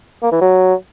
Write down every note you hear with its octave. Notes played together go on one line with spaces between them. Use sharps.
A#3
E3
F#3